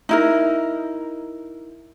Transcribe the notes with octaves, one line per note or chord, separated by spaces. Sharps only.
D#4 E4 A#4